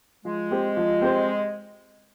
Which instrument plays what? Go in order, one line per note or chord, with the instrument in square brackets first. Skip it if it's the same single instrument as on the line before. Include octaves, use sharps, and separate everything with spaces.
[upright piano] F3 [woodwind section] G#3
[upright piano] C4 G4 C5
F3
C4 G4 C5